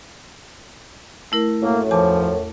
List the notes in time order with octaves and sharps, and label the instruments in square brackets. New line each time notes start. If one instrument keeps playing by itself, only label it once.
[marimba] A3 E4 A#4
[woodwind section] F#2 A2 [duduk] A#3
[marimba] E2 A5 D6 [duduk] F3